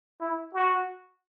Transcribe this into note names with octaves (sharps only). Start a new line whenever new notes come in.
E4
F#4